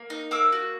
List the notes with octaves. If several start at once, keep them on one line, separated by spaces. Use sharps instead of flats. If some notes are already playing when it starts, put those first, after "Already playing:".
Already playing: A#3
D#4
A#3 D6 E6
F#4